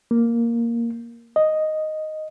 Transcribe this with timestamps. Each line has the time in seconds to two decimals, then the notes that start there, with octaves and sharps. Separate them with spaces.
0.11 A#3
1.36 D#5